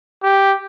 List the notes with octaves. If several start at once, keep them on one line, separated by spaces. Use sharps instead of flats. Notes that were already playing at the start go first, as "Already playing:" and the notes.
G4